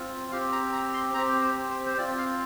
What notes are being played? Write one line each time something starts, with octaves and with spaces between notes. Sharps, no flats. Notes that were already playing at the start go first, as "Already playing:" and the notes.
Already playing: C4 F4
C4 G4 F5
A#5
A#5
C6
C4 G4 A#5
C5
C5
C5
C4 F4 D5
F5